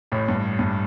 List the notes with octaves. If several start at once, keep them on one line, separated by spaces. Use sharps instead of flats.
A1 A2
G2
G2